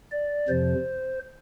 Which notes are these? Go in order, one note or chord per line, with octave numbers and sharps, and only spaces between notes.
D5
F2 C3 F3 C5